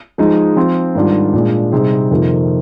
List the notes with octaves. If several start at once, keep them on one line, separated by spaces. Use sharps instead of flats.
F3 G#3 D#4
F3 C4 F4
G#2 D#3 G3 D4 F4
A#2 G#3 D4
C3 G3 C4 D#4 G#4
F2 C3 D#3 A#3 F4